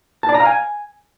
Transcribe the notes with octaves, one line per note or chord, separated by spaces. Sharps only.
A5
D5
A#5
F5
G#5